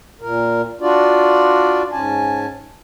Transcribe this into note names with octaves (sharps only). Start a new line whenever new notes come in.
A#2 A#4
D4 F4 F#4 D5
G#2 C#4 G#5 A5